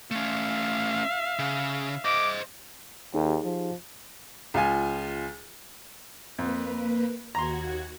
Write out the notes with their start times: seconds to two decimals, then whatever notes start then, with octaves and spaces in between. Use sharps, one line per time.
0.11 A3 C#4 E5 F5
1.39 C#3
2.05 C5 D#5 D6
3.14 D#2 D#4 G4 G#4
3.45 F3
4.54 C#2 F4 G#5
6.38 F2 A#3 B4
7.35 D#2 F#4 A#5 C6 G#6